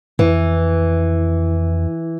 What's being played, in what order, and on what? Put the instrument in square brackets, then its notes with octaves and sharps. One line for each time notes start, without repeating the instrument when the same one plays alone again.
[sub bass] F2 [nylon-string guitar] E3